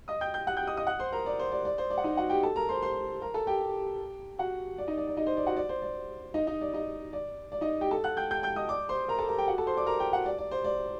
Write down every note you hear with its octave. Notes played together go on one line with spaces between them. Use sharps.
D#5 D#6
G5 G6
G5 G6
F#5 F#6
G5 G6
D#5 D#6
D#5 D#6
F#5 F#6
C5 C6
A#4 A#5
D5
C5
D5
D5
C5
D5
F#5
D#4 D#5
F#4 F#5
G4 G5
A4 A5
A#4 A#5
C5 C6
C5 C6
A#4 A#5
A4 A5
G4 G5
F#4 F#5
D5
D#4 D#5
D5
D5
D#4 D#5
C5
D5
F#4 F#5
D5
C5
D5
D#4 D#5
D#4 D#5
D5
D#4 D#5
D5
D5
D#4 D#5
G4 G5
A4 A5
F#5 F#6
G5 G6
G5 G6
G5 G6
D#5 D#6
D5 D6
C5 C6
A#4 A#5
A4 A5
A#4 A#5
G4 G5
F#4 F#5
A4 A5
C5 C6
D5 D6
A#4 A#5
G4 G5
F#4 F#5
D5
D5
C5
D5